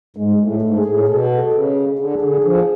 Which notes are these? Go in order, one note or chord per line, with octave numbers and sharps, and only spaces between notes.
G#2 G#3
A2
A3
G#2
G#4
A2
B2 A4
C#3
D3 G#4
D3
F3